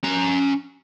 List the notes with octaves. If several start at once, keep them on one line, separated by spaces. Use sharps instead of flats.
C#4 A#5